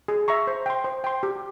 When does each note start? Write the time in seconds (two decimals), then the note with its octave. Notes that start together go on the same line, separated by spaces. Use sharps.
0.08 G#4
0.28 E5 A#5 C#6
0.47 C5
0.66 G5 C6
0.84 C5
1.04 G5 C6
1.23 G4